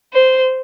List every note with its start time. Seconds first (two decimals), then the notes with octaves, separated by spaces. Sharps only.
0.13 C5